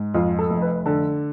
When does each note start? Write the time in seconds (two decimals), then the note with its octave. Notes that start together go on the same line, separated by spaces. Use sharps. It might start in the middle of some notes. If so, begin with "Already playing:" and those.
Already playing: G#2
0.14 F2 F4
0.39 A4
0.50 F1
0.62 B4
0.86 D3 A4